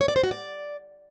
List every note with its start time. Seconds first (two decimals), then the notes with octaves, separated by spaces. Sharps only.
0.01 C#5
0.08 D5
0.16 C5
0.23 F#4
0.31 D5